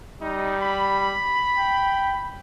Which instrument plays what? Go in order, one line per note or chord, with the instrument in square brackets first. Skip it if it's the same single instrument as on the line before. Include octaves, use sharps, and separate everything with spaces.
[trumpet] G3 [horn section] D#4
[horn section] B5
[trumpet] G5